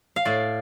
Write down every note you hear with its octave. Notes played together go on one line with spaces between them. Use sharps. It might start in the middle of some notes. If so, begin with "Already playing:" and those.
F5
A2 D5